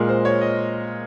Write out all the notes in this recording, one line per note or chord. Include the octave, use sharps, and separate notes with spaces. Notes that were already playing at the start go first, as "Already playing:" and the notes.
Already playing: A#2 G#3 A#4
C5
C#5
D#5